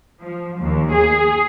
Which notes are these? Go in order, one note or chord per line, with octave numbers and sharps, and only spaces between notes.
F3
D#2
G#4